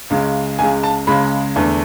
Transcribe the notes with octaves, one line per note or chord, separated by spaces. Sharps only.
C#2 C#3 G#3
C#2 C#3 G#3 G#5
A5
C#2 C#3 G#3 B5
E2 D3 A3